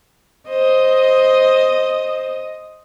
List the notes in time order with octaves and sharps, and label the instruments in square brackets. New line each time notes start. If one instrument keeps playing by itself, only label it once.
[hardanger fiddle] C5 [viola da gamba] D#5